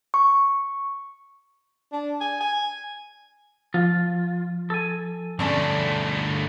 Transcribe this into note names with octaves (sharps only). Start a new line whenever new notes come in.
C#6
D4
G#5
G#5
F3 F4
A4 G#5
G2 D3 A3 C#4 D4 C#5